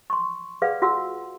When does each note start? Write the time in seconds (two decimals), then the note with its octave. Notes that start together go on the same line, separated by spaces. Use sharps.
0.10 C6 C#6
0.62 G#4 B4 D5 F5 F#5
0.82 F4 F#4 F#5 C6 E6